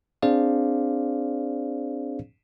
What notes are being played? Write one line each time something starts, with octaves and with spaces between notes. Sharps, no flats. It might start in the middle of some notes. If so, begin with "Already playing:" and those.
C4 D4 G#4 C5 D5 F5